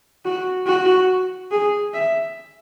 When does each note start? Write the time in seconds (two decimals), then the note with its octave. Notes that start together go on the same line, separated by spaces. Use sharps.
0.25 F#4
0.67 F#4
1.51 G#4
1.94 E5